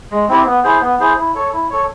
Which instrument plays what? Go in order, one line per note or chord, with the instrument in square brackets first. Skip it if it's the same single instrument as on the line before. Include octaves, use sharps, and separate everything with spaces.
[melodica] G#3
C4 E4 G4
B3
E4 G#4 C5
B3
E4 G#4 C5
E4
A4 C#5
E4
A4 C#5